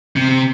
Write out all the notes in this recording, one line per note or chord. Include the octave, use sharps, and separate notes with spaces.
C3